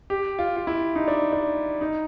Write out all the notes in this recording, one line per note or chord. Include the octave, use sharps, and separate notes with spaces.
G4
F4
F4
E4
D#4
D4
D4
D#4